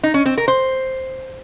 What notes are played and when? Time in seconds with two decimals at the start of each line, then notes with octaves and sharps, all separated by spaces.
0.03 D#4
0.14 C#4
0.26 C4
0.38 A#4
0.48 C5